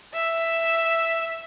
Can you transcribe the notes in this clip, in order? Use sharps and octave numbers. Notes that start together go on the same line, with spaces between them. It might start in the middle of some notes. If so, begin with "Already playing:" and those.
E5